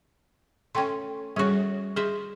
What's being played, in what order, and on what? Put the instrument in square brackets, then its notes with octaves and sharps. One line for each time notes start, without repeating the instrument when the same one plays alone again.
[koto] A3 C#4 [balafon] G5 C6
[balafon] G3 G#4 C#5 [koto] C#4 F#4
[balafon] G#4 [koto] C5 D#5 E5